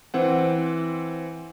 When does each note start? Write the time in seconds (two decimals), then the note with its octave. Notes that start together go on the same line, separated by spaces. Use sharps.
0.14 E3 C4 F#5